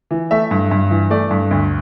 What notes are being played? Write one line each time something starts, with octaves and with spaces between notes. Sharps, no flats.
E3
A3 E5
G2
G2
E3
A3 D5
G2
D2